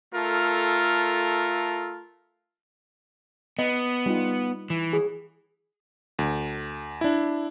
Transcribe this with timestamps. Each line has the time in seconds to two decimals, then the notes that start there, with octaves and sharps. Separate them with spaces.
0.14 A3 F4 A4 A#4
3.59 B3 D#5
4.06 G3 D#4 F4
4.70 E3
4.93 G#4
6.19 D2
7.01 D4 E4